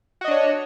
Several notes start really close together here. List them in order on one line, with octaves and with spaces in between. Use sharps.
F#4 D#5 D4 C#5